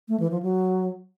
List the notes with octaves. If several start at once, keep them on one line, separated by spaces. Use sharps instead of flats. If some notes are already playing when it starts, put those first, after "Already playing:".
A3
E3
F3
F#3